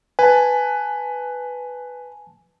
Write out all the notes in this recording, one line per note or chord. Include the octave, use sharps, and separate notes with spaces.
B4 G#5 A5